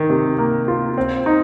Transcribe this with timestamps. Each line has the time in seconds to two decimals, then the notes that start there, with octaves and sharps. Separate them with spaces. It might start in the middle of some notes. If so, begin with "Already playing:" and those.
Already playing: D#3
0.10 C3
0.38 A#3
0.68 F4
0.97 C4
1.26 D#4